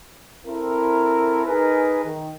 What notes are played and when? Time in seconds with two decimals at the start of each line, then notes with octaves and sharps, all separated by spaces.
0.46 C4 E4 A4 A#4
1.46 D#4 G#4 A#4 B4
2.04 D#3